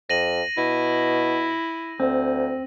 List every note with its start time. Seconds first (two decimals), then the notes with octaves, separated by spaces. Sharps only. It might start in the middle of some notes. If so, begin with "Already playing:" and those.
0.10 F2 A#6 D#7 F#7
0.58 B2 E4
2.00 D2 C4